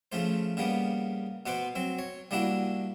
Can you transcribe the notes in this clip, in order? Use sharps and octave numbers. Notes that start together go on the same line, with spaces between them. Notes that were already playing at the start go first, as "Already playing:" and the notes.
C#3 F3 A3 C5
C#3 G3 A#3 B3
B2 B3 B4 C5 D6
F#3 C4
C#5
G3 A#3 D4 E4 F#4